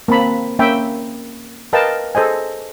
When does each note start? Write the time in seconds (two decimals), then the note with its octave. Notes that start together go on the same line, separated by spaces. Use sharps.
0.08 A#3 C4 A5 B5
0.59 A#3 C#4 E5 G5 B5
1.73 A#4 B4 D#5 F5 G5 A5
2.15 G#4 A4 C5 D#5 G#5